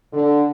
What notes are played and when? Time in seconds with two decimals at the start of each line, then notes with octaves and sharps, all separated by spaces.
0.13 D3